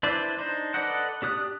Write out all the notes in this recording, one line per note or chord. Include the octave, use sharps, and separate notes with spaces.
D4 E4 B4 C5 D5
D4 D#4 C5
A4 B4 D5 D#5 F#5
D4 G4 D#6 F#6